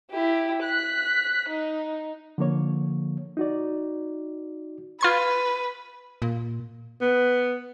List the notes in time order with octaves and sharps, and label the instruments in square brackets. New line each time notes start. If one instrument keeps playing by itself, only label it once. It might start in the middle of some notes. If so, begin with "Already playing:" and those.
[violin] E4 G4
F#6 B6
D#4
[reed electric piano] D3 F3 A#3 C#5
D#4 F#4 D5
[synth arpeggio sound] F4 C6 G#6 [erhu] B4
[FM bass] A#2
[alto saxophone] B3